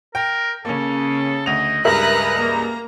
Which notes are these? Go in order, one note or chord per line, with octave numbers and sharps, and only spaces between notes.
A#4 G5
C#3 A#3 C#4 A4
D2 D#5 F7
C#2 G2 A#4 B4 D#5 E5 A#5 F#6
A#3 A#5